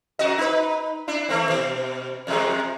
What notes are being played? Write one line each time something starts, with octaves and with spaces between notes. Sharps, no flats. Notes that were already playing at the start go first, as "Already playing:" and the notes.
F#2 F#4 D#5
D#4 B4
D4 E4
D#3 A3 C4
B2
F2 C3 G#3